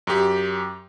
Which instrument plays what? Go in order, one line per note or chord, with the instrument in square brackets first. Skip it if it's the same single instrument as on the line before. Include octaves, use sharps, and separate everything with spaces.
[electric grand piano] F#2 G4